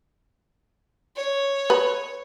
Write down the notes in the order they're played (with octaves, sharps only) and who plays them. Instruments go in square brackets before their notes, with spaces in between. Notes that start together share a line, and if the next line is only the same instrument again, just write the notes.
[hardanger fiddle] C#5
[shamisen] B4